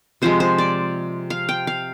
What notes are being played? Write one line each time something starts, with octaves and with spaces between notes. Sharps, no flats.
C3 F3 G#3 C5
C5
D5
F5
G5
F5